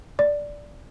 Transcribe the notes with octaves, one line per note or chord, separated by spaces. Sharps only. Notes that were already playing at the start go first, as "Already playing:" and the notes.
D5